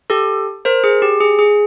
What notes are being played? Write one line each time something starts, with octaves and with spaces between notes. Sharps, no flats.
G4 A4
A#4 C5
G#4
G4
G#4
G#4